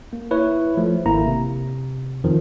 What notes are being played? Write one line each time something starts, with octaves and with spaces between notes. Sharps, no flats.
A#3
E4 B4 C#5
F3 A3
G#1 A#3 E4 A#5
C3
F2 D#3 F3